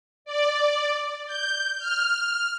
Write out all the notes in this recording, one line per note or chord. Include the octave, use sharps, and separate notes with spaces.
D5
G6
F6